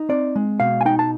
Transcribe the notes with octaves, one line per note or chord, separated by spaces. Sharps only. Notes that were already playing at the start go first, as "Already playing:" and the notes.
Already playing: D#4
C4 D5
G#3
B2 F5
G#5
D#4 G5
A5